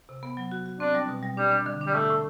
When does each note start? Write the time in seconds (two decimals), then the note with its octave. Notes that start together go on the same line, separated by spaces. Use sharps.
0.09 C3
0.23 B3
0.37 F#3
0.51 F#4
0.66 F#4
0.80 C4 D4
0.95 G3
1.09 B2
1.23 G3
1.37 G3 D4
1.51 D4
1.66 D3
1.81 D4
1.87 G3
1.94 A2 A3
2.10 A2